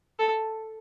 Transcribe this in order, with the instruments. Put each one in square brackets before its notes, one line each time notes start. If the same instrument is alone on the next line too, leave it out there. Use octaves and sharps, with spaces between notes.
[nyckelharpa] A4